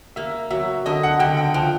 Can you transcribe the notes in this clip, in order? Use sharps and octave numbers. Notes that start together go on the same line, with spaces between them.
A#3 E5
F#3 E5
D3 D#5
F#5
D3 G5
G5
F3 G5